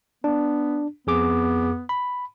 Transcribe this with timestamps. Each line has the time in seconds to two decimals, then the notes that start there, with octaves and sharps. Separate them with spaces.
0.24 B3 D4
1.07 F2 B3 G#4 D6
1.89 B5